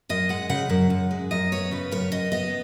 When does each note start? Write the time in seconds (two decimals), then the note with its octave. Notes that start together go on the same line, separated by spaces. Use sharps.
0.09 F#2 D#5
0.29 G#3 F#5
0.49 C#3 F#5
0.70 F#2
0.90 F#2
1.11 G#3
1.31 F#2 D#5
1.52 B3 C#5
1.71 C#3 B4
1.91 F#2 C#5
2.12 F#2 D#5
2.32 B3 D#5